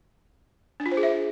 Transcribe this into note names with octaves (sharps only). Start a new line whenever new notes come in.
D4
F4
C5
G#4
E5